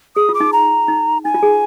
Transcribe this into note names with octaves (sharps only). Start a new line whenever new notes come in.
G#4 D#6
F4
D6
D#4
A#5
D#4
D#4 G#5
F4
G#4